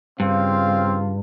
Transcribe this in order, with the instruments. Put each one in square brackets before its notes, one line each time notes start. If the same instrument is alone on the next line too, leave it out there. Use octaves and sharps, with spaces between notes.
[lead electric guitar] G2 [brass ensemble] C#3 F4 F5 [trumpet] C4